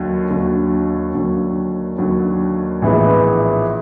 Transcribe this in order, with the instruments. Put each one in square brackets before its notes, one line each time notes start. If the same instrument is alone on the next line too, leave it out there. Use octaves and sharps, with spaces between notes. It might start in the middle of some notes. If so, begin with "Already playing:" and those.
Already playing: [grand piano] D#2 D3 F#3
D#2 D3 F#3
D#2 D3 F#3
D#2 D3 F#3
A#1 A2 E3 G#3 B3